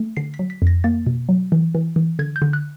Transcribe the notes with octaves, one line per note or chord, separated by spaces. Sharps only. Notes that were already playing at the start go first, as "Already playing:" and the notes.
Already playing: A3
D3 C7
B6
F#3
B6
F2 A#6
A#3 A6
B2
F#3
E3
E3
E3
D3 G#6
G6
D3
F#6